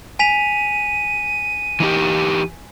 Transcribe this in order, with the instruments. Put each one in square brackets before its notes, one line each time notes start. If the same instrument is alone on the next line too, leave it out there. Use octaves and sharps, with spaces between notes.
[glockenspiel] G#5 B6 F7 [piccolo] D#7
[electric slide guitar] E3 D#4 G4